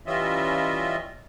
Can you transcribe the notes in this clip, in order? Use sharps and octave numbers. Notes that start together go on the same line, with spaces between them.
E3 G3 C#4 F4 D#5 E5